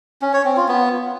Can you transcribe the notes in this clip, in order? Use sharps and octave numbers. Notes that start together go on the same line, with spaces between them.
C#4
C#5
C4
F4
B3